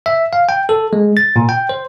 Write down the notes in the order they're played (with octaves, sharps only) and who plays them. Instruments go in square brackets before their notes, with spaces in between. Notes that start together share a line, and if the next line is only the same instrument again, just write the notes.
[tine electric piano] E5
F5
G5
A4
G#3
A6
A#2
G5
C5